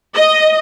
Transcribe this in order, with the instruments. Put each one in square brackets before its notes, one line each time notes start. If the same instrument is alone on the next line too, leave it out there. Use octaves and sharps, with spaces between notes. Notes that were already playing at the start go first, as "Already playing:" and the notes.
[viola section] D#5